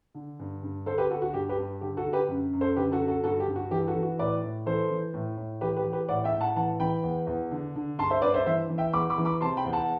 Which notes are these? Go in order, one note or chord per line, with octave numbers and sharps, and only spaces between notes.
D3
G2
G2
D3 A4 C5
G4 B4
D3 F#4 A4
F#4
G2 G4
G4 B4
G2
D3 G4
F#4 A4
D3
G4 B4
F#2
F#2
A4 C5
D3 G4 B4
F#4 A4
D3
F#4 A4
G2 F#4 A4
G4
G2
F#4
E3 G4
F#4 A4
E3
F#4
A2 B4 D5
A2
E3 A4 C5
E3
A2
A2
E3 G4 B4
G4 B4
E3
G4 B4
A2 D5 F#5
E5 G5
A2
F#5 A5
E3 F#5 A5
E3 G5 B5
E2
E2
D3
D3
G2 A5 C6
C5 E5
G2 B4 D5
C5 E5
E3 C5 E5
E3
E5 G5
E2 B5 D6
B5 D6
E3
B5 D6
C3 A5 C6
G5 B5
E2
F#5 A5